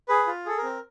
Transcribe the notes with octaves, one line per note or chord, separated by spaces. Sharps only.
G#4 B4
F4
G#4 A4
A#4
C4